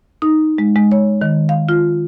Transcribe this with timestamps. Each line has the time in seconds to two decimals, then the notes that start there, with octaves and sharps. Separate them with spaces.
0.22 D#4
0.58 G#3
0.76 G#3
0.92 C#5
1.21 D#3
1.49 F5
1.69 F4